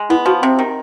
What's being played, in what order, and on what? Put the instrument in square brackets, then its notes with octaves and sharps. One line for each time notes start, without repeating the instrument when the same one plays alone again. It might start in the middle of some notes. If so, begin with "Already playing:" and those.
Already playing: [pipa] G#3
[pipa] B3 [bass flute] E4
[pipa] F3 [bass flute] F#4
[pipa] C3 [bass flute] C4
[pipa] D#3